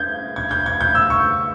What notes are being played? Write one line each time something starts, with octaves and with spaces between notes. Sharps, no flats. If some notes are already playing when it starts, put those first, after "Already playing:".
Already playing: G6 G#6
G#6
G6
G#6
G6
E6
C#6